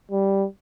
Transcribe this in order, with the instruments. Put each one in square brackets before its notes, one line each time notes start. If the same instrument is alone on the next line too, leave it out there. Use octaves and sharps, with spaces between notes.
[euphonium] G3